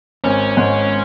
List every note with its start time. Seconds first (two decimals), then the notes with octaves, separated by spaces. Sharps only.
0.24 G#1 C#4
0.57 G#2